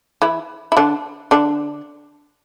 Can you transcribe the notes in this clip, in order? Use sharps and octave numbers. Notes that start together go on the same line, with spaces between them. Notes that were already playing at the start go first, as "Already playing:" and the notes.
E3 E4
E4
D3 D4
D3 D4